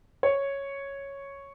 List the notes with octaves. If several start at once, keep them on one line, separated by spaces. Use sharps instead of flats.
C#5